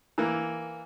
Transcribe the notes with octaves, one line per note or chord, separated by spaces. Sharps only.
E3 A#3